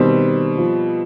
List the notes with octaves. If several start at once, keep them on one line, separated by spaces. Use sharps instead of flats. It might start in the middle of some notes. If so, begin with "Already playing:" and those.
Already playing: B2 D#3 G3 C4
F3